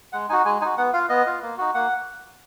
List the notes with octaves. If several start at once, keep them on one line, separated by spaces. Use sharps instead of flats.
G#3 F#5
D#4 F#4 G#5
G#3 G#5
D#4 F#4 G#5
B3 F#5
F4 F5
B3 D#5
F4
A#3
D#4 F#4
A#3 F#5